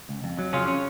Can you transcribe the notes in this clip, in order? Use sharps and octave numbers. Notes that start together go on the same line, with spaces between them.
C#2
F2
F#3
C#3 C#4 F4
C#4